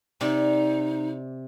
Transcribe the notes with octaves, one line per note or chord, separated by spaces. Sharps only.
C3 D#4 D5